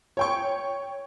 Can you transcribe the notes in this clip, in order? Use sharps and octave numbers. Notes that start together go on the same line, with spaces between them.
C#5 G5 C#6